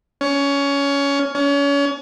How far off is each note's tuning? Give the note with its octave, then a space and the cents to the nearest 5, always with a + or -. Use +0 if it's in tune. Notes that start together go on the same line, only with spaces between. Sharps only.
C#4 +20
C#4 +35